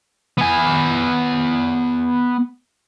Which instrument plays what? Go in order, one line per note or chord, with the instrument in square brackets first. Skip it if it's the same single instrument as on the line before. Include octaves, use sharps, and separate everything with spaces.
[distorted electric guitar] B3 G#5